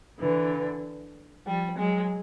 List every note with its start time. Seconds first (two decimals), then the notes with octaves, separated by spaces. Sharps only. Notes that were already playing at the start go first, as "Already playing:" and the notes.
0.21 D3 E3
1.46 F3 G3
1.76 F#3 G#3